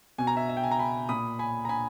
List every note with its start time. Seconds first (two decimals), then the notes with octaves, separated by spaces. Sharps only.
0.18 B2 G#5
0.27 A#5
0.36 E5 G#5
0.49 E5
0.57 G5
0.64 G#5
0.71 A#5
0.79 G#5 B5
1.09 A#2 B5 D#6
1.39 G#5 B5
1.65 A#5
1.69 G#5 B5